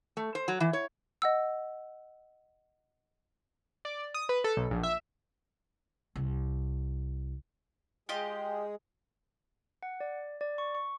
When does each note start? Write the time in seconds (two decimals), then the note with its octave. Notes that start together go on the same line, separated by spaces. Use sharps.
0.17 A3
0.35 C5
0.48 F#3
0.60 E3
0.73 C#5
1.22 D#5 F#5 E6
3.85 D5
4.14 D#6
4.29 B4
4.44 A4
4.57 B1
4.71 A#1
4.83 E5
6.16 C2
8.09 G#3 F4 G4 G#4 D#5
9.83 F#5
10.00 D5
10.41 D5
10.58 C#6
10.75 C#6